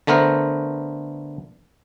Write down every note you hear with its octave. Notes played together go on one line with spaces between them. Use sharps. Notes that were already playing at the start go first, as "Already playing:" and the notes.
D3 A3 B3 A#4 C5